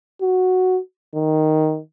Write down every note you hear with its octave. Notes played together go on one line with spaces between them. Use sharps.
F#4
D#3